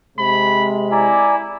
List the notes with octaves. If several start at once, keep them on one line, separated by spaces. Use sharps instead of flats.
C3 G#3 B5
E4 D5 G#5 A#5